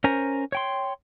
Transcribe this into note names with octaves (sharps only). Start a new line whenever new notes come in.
C#4 A#4 C5 G#5 A#5
C#5 G5 C6